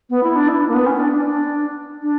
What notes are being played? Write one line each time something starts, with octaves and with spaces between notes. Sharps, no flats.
B3
E4
D4
E4
D4
A#3
B3
C#4
D4
D4
D4
D4